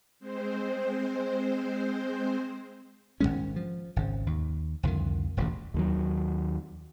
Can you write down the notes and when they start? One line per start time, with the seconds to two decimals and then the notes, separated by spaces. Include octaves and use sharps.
0.20 G#3 C4 C5
3.20 G#1 F2 G#3 C#4
3.56 F3
3.96 G#1 C#3
4.26 D#2
4.83 C2 F2 D3 D#3
5.37 D#1 A1 F2 C#3
5.74 D#2 D#3 F#3